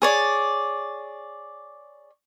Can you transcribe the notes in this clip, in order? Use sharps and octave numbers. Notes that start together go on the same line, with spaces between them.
G#4 C#5 D5